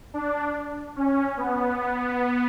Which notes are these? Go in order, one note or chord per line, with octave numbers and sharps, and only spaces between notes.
D4
C#4
B3